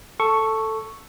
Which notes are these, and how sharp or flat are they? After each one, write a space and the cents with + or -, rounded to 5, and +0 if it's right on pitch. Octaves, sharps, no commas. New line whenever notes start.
A4 +5 C#6 +0